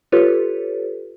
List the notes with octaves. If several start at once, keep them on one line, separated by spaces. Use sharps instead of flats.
F4 G4 A4 B4 C#5